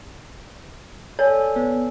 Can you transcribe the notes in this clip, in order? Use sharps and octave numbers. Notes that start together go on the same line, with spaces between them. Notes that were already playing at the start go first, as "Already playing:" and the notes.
A4 C#5 D5 G#5
B3